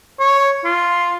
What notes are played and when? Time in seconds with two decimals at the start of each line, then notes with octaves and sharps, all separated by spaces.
0.20 C#5
0.64 F4